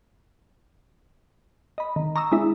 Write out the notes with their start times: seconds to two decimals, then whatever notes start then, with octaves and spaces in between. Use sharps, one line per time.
1.78 D#5 B5
1.96 D#3
2.16 A#5 C#6 D#6 E6
2.32 G#3 D4 E4 E5